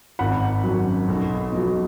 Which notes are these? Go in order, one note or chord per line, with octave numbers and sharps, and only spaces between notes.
G#1 F#5 B5
F#2 F#3
B1
B2 F#3